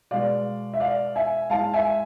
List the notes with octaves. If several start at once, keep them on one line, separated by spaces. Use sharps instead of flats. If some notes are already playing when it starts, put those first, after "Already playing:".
B2 G#3 D5 F5
E5
D5 F5
E5 G#5
A2 G#3 F5 A5
E5 G#5